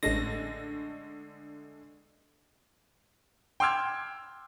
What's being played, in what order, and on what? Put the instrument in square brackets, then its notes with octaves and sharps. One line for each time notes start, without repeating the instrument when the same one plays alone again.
[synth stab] A1 A#6 [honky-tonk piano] D3 G#3 A3
[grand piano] G5 C6 D6 E6 F6 G#6